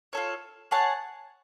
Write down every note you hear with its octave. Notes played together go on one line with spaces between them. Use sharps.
F4 A4 C#5
G#4 C#5 F#5 A5